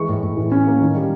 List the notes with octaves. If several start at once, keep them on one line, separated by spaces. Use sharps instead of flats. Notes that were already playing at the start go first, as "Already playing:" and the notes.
Already playing: E3 G#3 C#6
A2
A2
E3
C#4
A#3
D#3
G3